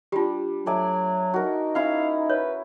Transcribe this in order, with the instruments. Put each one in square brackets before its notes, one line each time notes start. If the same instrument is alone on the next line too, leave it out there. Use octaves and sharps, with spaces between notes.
[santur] G3 D4 [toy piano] F4 G4
[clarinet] F#3 [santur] A3 D5 G#5
[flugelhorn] D#4 [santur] F#4 A#4
[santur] C#4 E4 [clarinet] F5
[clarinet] B4 [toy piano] C#5